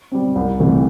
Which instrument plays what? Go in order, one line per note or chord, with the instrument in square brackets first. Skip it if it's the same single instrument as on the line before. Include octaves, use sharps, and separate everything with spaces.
[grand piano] G3 C4
C2
C3 E3 A3